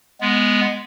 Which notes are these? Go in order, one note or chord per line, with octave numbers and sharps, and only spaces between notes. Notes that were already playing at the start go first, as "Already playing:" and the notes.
G#3 B3